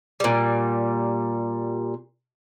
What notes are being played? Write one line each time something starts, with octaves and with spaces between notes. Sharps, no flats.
A#2 G3